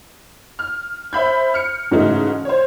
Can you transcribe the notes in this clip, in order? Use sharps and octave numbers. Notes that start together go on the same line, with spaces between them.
F6
C5 E5 B5 G6
F6 C#7
G#2 C#3 E3 A3 D#4 F#4
C5 C#5